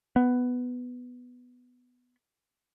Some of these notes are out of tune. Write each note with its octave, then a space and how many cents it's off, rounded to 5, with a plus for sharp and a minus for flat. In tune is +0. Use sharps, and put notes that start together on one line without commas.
B3 +5